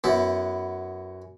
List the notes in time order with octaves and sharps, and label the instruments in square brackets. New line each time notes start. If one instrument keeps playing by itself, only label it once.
[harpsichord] F#2 B3 E4